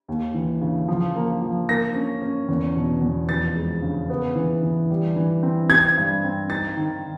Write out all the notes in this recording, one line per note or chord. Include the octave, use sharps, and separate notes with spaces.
D#2
E3
C#3
F3
A#3
F3
A#3 A#6
C#4
C#4
E2
B2
E2
F2 A6
G#3
C#3
B3
E3
E3
G3
E3
C4
C4 G#6
G2
C4
D#4 A6
D#3